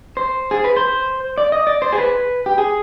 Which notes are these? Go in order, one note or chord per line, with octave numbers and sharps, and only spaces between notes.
C5
G#4
B4
C5
D5
D#5
D5
C5
G#4
B4
G4
G#4